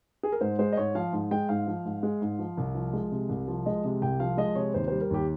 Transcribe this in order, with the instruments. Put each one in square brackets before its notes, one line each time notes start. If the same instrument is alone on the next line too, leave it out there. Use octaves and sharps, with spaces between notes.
[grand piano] G#4
A#4
G#2 C5
G#3 C5
D#5
G#2 C#5
F3 F5
G#2
G#3 G5
G#2 F5
F3
G#2
G#3
G#2
F3
C2
F3
G#3
C3
C2
F3
G#3 D#5
C3
C2 G5
F3 F5
G#3 D#5
C3 C#5
D#2 C5
G3 C5
A#4
D#2 G4